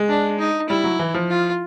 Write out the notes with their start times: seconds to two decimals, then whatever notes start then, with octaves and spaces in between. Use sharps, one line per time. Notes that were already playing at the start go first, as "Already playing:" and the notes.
Already playing: G#3
0.09 D4
0.39 D#4
0.69 G3 E4
0.84 F#3
0.99 E3
1.14 F3
1.30 F4